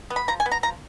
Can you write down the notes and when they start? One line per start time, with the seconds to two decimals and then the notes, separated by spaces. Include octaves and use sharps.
0.10 B3
0.16 B5
0.28 F3 A#5
0.40 G#5
0.46 B3
0.52 A#5
0.63 F3 A#5